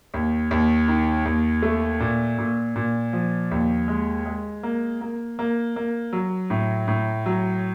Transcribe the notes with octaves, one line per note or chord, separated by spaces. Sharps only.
D#2
D#2
D#3
D#2
A3
A#2
A#2
A#2
F3
D#2
G#3
G#3
A#3
A#3
A#3
A#3
F#3
A2
A2
F#3